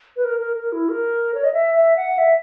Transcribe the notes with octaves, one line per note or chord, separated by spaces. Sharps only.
B4
A#4
A#4
A#4
E4
A#4
C#5
D#5
E5
E5
F#5
E5